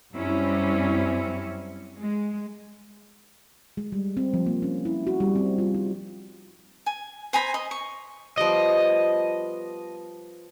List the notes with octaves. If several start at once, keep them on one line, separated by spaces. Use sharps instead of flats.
F#2 G3 C4 C#4 E4
G#3
G#3
G3
C4
F3
A#3
C#4
E4
F#4
G3
C4
F4
D#4
G#5
C5 G#5 A#5 B5
D#5
C#6
F3 G3 B3 D#5